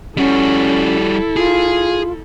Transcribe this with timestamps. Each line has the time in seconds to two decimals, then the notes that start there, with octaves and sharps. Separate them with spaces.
0.17 G3 C#4 E4 F#4 A4
1.36 F4 G#4